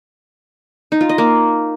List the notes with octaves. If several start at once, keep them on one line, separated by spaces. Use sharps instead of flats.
D#4
F4
D#5
A#3